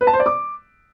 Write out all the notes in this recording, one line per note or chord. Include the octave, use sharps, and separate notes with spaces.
B4
A5
C5
D5
D6